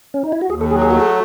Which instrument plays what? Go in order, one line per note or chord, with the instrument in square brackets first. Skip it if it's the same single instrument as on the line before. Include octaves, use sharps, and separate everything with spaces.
[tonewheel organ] C#4
D#4
E4
F#4
[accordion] D#2 [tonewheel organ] G#4
[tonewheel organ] A4
[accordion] F#3 [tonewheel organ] G#4
[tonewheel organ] G#4
[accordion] A3 [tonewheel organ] F#4
[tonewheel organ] G#4